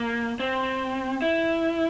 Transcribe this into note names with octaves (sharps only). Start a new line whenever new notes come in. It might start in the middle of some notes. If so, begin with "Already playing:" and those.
Already playing: A#3
C4
E4